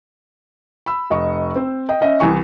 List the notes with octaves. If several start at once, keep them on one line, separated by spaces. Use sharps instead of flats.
B5 E6
F1 D#5 C#6
C4 C5
D#5 G5
C#4 D#5 E5
C2 E3 G#5 C#6